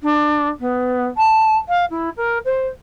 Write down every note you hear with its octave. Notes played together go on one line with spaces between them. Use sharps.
D4
B3
A5
F5
E4
A#4
C5